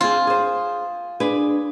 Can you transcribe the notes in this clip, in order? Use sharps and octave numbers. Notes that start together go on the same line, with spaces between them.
C4 F4 G#4
G#4 C5
D4 G#4 B4